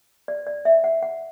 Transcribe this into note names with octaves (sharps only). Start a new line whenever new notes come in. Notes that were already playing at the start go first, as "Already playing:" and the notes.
D5
D5
E5
F#5
F#5